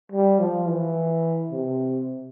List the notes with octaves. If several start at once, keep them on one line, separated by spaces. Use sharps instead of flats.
G3
F3
E3
C3